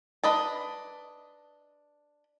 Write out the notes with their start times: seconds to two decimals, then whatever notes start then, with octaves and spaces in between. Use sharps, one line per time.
0.24 D4 B4 D#5 A5